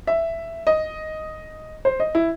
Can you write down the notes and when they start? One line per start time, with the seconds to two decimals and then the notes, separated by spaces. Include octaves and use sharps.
0.07 E5
0.67 D#5
1.85 C5
2.00 D#5
2.15 E4